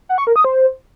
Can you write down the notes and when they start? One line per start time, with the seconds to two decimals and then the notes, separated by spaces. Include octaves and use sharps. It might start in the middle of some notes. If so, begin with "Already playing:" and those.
0.09 F#5
0.18 C#6
0.27 A#4
0.36 D#6
0.44 C5